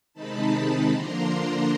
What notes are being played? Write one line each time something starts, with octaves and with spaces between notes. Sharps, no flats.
C3 D#3 G#3 C4 D#4 A5 B5
D3 F3 A#3 D4 A#5 C6